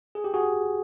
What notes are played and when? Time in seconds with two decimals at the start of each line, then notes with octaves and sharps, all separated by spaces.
0.15 G#4
0.24 G4
0.34 F#4 G#4